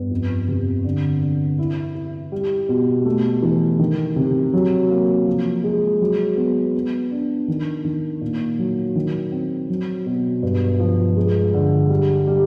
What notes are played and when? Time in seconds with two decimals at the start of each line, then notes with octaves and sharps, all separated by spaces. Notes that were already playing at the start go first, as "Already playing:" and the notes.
Already playing: G2 B3
0.11 F2
0.48 C3
0.84 D3
1.21 D3
1.59 E4
1.95 E4
2.32 G3
2.69 B2
3.05 A3
3.42 E3
3.79 D#3
4.16 C3
4.53 F#3
4.90 A#3
5.27 F3
5.64 G#3
6.00 F#3
6.37 B3
6.74 B3
7.11 D4
7.48 D#3
7.85 D#3
8.21 A#2
8.58 F#3
8.96 D#3
9.32 C4
9.69 F#3
10.06 B2
10.43 G2
10.80 F3
11.17 G#3
11.54 D3
11.90 G3
12.27 G3